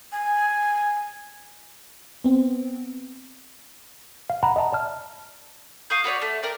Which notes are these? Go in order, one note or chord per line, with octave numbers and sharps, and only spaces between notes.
G#5
B3 C4
F5
F#5 A#5 B5
D#5 E5 A5 A#5
D5 A5 F6
F5 C#6 D#6 G6
F#4 B4 C#5 D5
A3
A#4 D5 G5